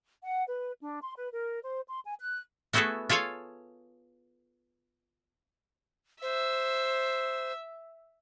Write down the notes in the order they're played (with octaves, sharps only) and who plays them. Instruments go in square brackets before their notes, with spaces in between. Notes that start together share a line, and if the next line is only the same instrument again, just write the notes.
[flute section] F#5
B4
D4
C6
B4
A#4
C5
C6
G#5
F#6
[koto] A3 B3 E4 F#4 G#4 A4
F4 G#4 A4 C#5 F5
[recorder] C5 [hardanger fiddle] E5